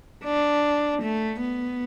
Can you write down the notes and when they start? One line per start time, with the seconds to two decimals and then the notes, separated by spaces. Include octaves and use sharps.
0.24 D4
1.02 A3
1.40 B3